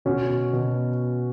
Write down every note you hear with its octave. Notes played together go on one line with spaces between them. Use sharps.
B2 C#4 F#4
B2
B2